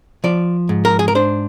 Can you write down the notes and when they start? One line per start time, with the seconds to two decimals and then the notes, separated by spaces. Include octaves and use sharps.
0.24 F3 D5
0.69 G#2
0.85 A#4
0.99 G#4
1.08 A#4
1.15 D4 C5